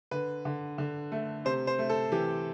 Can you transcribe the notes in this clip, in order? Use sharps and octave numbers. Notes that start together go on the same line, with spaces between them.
D3 B4
D3
D3
A3
C3 C5
C5
A3
A4
E3 G4